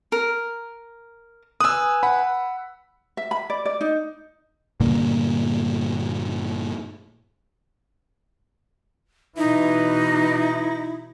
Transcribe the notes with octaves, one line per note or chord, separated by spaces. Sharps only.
A#4
B4 G#5 D#6 E6
F#5 B5
E5
B5
D5
D5
D#4
G2 A#2 D3 A#3
B2 E3 D#4 E4